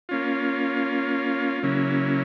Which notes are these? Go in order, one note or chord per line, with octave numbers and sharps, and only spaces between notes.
A#3 C#4 F4
C#3 F#3 A#3 C#4 E4